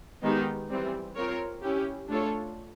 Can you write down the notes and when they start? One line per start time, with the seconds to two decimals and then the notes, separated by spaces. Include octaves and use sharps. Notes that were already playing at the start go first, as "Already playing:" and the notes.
0.23 D#3 G#3 B3 D#4 G4
0.70 E3 G3 C4
1.16 C4 F4 A#4 C#5
1.62 C#4 E4 G4
2.09 A3 D4 F4 A4 C#5